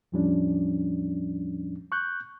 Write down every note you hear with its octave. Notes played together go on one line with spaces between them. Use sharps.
E2 A2 F3 G3 C#4 D4
C#6 F#6 G6